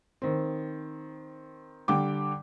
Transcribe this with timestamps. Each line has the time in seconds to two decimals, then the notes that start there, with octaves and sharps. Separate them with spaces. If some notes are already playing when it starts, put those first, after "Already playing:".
0.22 D#3 C4
1.88 D3 G3 G5 D6